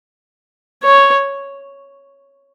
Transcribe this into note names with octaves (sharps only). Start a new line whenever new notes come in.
C#5